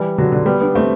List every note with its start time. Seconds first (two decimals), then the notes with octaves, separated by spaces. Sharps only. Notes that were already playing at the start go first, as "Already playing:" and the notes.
Already playing: E3 G3
0.18 D3 F#3
0.32 D3
0.46 G3 B3
0.61 B3 D4
0.75 A3 C4